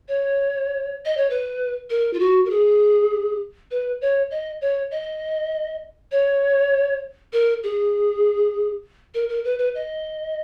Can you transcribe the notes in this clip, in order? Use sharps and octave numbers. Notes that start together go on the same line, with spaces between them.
C#5
D#5
C#5
B4
A#4
F4
F#4
A#4
G#4
B4
C#5
D#5
C#5
D#5
C#5
A#4
G#4
A#4
A#4
B4
B4
D#5